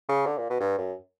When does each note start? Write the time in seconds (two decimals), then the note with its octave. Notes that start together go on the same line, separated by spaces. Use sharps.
0.09 C#3
0.26 D3
0.38 A#2
0.50 B2
0.60 G2
0.78 F#2